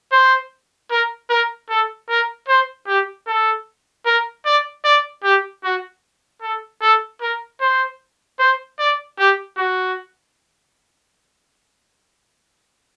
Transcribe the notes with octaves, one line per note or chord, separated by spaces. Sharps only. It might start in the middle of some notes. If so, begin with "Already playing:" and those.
C5
A#4
A#4
A4
A#4
C5
G4
A4
A#4
D5
D5
G4
F#4
A4
A4
A#4
C5
C5
D5
G4
F#4